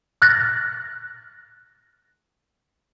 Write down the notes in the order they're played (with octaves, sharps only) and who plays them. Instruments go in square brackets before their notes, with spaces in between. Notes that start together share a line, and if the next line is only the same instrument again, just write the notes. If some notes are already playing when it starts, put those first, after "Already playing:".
[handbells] F6 F#6 A6 A#6